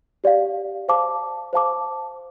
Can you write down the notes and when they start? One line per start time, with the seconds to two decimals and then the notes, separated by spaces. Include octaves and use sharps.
0.24 G4 D5 F5
0.88 C5 F5 A5 D6
1.53 C5 F5 A5 D6